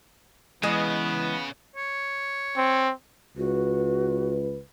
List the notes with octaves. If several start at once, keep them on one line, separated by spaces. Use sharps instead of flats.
C#3 E3 G#3 B3 D#5
C#5
C4
C#2 F#4 B4